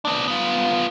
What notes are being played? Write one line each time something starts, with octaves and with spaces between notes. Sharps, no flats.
B3 D4
B3 F4